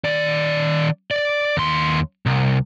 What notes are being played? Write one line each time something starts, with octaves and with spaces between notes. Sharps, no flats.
D#3 D5
D5
D#2 C6
C2